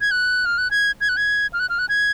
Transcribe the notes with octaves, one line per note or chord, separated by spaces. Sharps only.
G#6
F#6
F6
F#6
G#6
G#6
F#6
G#6
F6
F#6
F6
F#6
G#6